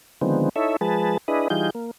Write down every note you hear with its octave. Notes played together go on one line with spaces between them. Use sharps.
D3 D#3 F3 G#3 B3 C4
D#4 E4 A4 C#5 E5
F3 G#3 G#4 B4 A5
D4 E4 G#4 B4 D#5
E3 G3 D#4 F4 G#4 G6
A#3